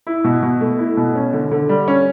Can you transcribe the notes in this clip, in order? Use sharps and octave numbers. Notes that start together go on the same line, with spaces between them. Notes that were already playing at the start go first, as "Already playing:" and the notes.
E4
B2
B2
A3
E4
B2
C#4
D3
D3
G3
C#4